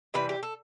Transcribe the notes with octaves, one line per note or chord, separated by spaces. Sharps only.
C3 E3 G3 B4
G4
A4